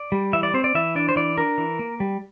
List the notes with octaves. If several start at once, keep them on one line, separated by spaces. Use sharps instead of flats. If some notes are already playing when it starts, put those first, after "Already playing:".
Already playing: D5
G3
E3 E5
D5
C4 C5
D5
E3 E5
D4 D5
C5
E3 D5
D4 A#4
E3
A#3
G3